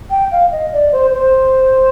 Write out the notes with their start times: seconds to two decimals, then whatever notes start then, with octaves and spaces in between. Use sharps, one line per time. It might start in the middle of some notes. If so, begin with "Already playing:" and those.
0.10 G5
0.32 F5
0.52 D#5
0.73 D5
0.92 C5
1.13 C5